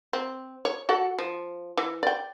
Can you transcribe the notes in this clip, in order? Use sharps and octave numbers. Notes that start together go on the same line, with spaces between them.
C4
C#5
F#4 A4 F#5
F3
E3
D5 G5